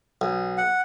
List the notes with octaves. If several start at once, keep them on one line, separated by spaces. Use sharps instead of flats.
B1
F#5